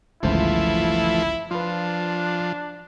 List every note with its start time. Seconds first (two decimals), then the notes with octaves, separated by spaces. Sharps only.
0.23 G1 C#2 E3 F3 A3 E4 C5
1.51 F3 D4 F4 B4